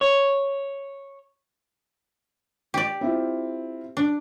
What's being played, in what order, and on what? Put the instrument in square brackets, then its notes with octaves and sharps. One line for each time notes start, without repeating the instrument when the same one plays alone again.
[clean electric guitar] C#5
[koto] G4 D5
[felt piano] C4 E4 F4
[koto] D4